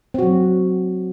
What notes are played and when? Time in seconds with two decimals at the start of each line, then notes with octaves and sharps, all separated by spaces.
0.14 C4
0.18 F#4
0.23 F#3